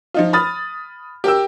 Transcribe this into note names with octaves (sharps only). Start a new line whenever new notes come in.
F3 D#4 F4
B5 D#6 F6 A6
G4 A#4 G5 E6